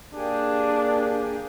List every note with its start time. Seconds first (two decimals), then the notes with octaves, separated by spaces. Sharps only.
0.14 A#3 D4 G4 G#4